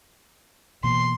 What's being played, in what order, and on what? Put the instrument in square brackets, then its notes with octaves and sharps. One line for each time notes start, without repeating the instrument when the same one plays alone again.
[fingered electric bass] B2 E3 A#3 [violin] C6